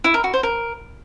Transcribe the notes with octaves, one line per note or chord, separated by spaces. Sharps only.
E4
A#4
F#4
C5
A#4